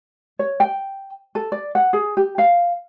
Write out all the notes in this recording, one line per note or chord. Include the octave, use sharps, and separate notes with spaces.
C#5
G5
A4
D5
F#5
G#4
G4
F5